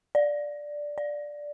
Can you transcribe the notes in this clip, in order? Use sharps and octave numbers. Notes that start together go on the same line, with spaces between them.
D5
D5